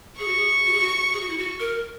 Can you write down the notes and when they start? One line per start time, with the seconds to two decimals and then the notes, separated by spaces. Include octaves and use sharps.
0.19 G#4 C#6
0.28 F#4
0.37 G#4
0.66 F#4
0.73 G#4
0.80 F#4
1.13 G#4
1.20 F#4
1.30 E4
1.38 F#4
1.60 A#4